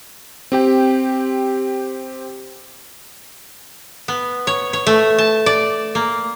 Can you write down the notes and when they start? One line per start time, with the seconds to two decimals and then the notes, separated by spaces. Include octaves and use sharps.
0.52 C4 G4 G5
4.08 B3
4.47 C#5
4.73 C#5
4.87 A3
5.18 A5
5.46 D5
5.95 A#3